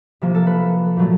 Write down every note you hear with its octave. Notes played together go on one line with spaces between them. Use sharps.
C3 F3 A#3
A4
B4
A#2 F#3 A3